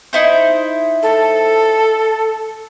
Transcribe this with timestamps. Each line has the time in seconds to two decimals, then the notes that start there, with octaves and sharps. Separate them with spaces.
0.13 D#4 E4 C5
1.03 A4